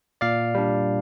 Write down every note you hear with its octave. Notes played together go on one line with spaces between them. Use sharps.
A#2 D5 F5
G3 D4